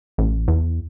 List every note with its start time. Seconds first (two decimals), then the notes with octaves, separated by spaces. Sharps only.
0.18 A1
0.48 E2